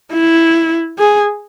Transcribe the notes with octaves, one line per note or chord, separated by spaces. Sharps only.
E4
G#4